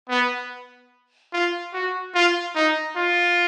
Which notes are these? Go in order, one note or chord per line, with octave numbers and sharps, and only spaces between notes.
B3
F4
F#4
F4
D#4
F4